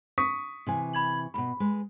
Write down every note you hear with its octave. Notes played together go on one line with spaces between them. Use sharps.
C#6 D#6 B6
C3 E3 G#5
B5 G#6 F#7
D#2 B2 B5
G#3 B4